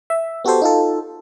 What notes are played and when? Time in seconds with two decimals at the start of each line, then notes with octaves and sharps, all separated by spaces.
0.10 E5
0.45 B3 F#4 G4 A4 C5
0.62 D#4 F4 A4